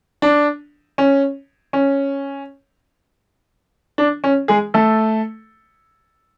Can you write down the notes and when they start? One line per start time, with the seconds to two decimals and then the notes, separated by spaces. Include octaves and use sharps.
0.22 D4
0.98 C#4
1.73 C#4
3.98 D4
4.24 C#4
4.48 G#3 G#4
4.74 A3 A4